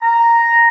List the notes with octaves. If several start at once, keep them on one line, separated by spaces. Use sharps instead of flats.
A#5